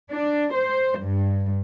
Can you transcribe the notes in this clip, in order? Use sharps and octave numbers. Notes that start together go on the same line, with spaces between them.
D4
C5
G2